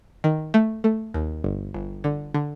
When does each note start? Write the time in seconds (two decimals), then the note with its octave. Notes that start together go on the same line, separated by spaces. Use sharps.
0.24 D#3
0.54 A3
0.84 A3
1.14 D#2
1.44 G1
1.74 G1
2.04 D3
2.34 D3